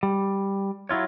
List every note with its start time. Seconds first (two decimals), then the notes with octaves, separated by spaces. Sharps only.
0.03 G3
0.89 F#3 E4 F4 C#5